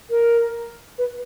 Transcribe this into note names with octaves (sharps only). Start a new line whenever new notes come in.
A#4
B4